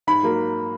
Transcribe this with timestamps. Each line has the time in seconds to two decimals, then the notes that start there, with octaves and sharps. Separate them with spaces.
0.07 G#2 B5
0.23 F#3 A#3